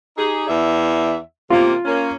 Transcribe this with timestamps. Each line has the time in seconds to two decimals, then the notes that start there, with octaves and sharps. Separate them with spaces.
0.17 D#4 G4 G#4
0.47 E2 D5 E5
1.50 C3 A#3 F4
1.85 A#3 C#4